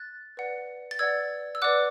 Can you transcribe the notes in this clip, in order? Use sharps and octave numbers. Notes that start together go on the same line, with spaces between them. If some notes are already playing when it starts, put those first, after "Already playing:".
Already playing: F#6 A6
B4 D5 F#5
A6
B4 D5 F#5 E6 G#6
E6
B4 D5 F#5 D6 F#6